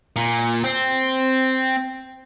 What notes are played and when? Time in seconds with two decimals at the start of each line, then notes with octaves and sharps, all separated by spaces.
0.16 A#2
0.64 C4